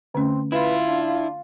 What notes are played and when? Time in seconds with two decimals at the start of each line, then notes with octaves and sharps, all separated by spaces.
0.15 D3 A3 C4 C#4
0.52 E4 F4 B4
0.88 D4